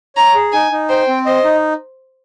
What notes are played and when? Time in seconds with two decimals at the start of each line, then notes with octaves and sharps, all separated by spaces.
0.16 C#5 A#5
0.34 G#4
0.52 D#4 G#5
0.71 D#4
0.89 C5 G5
1.08 C4
1.26 C5 D#5
1.44 D#4